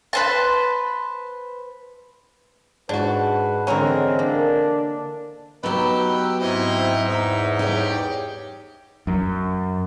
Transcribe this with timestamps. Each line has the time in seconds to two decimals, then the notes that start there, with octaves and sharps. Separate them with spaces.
0.13 B4 C5 A5
2.89 G#2 D4 F#4 B4
3.67 D3 E3 G#3 C4 C#4 A#4
4.19 A#3 D4
5.63 F#3 B3 D#4 G4 B4 E6
6.41 G#2 C4 E4 D#5 E5
7.07 E2 D#4 E5
7.59 D#4 G4 G#4 C#5
9.07 F#2